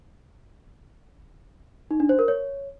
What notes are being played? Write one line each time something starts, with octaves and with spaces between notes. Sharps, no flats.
D#4
D4
C5
A#4
C#5